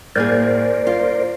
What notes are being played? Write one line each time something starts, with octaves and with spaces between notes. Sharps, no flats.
A2 A#3 G#4 A#4 C5 D5
F4